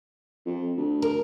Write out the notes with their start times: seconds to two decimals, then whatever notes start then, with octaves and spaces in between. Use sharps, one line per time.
0.46 F2
0.77 D2
1.02 A#4